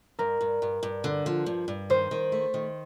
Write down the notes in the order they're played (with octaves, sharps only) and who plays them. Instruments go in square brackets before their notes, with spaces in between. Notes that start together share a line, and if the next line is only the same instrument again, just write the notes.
[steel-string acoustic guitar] G2 [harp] A#4
[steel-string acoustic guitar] G2
G2
G2
D3
F3
G2
G2
[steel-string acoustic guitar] D#3 [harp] C5
[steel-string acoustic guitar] D#3
A3
D#3